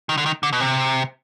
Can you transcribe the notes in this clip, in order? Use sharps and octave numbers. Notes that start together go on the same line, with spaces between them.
D#3
D3
D#3
D3
B2
C3